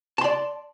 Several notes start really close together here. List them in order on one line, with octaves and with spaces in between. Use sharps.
A5 C6 D5